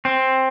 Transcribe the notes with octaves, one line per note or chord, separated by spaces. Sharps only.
C4